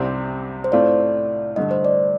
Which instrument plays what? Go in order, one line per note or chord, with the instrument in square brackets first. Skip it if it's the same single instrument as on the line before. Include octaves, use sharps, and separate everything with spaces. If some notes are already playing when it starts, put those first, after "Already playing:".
Already playing: [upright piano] C2 C3 G3 C4 [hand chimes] D5
[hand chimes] C5
[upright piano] A2 A3 C4 F4 [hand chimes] D5
[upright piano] G2 D3 A3 [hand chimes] D#5
[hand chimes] C5
D5